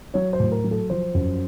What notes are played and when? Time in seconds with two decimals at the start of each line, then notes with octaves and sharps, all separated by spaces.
0.14 F#3 C#5
0.33 C5
0.40 A2
0.52 A#4
0.64 F#3
0.71 A4
0.90 F3 C5
1.14 F#2